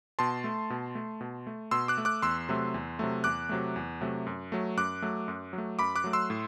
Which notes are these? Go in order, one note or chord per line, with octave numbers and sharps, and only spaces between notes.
B2 A5 C6
A3
B2
A3
B2
A3
B2 C6 E6
D6 F#6
A3
D6 F#6
E2 C6 E6
C3 F#3 A3
E2
C3 F#3 A3
E2 D6 F#6
C3 F#3 A3
E2
C3 F#3 A3
F#2
F#3 A3
F#2 D6 F#6
F#3 A3
F#2
F#3 A3
F#2 B5 D6
D6 F#6
F#3 A3
C6 E6
A2